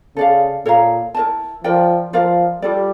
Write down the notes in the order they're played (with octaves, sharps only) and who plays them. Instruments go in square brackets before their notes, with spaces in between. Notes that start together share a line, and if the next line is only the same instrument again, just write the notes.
[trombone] C#3 [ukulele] A4 D5 F5
[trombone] A#2 [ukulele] A4 C#5 F5 A#5
[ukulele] E4 A#4 D5 A5
[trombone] F3 [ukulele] A#4 D5 G5
[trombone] F3 [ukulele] F4 A#4 D5 F5
[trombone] G3 [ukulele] F4 A4 D5